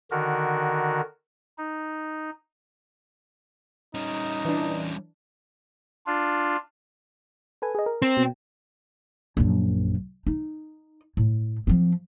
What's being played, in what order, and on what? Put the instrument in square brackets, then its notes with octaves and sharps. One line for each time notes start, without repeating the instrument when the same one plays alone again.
[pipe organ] D3 D#3 F#4 A#4
D#4
[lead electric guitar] G3 C#4 [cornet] D#4
[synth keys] E3 D4
[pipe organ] D4 F4
[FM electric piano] A4 B4 G#5
G#4 D#5
A#4
[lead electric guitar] C4
[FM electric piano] B2
[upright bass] A#1 F#2
D#4
A2
F3 C4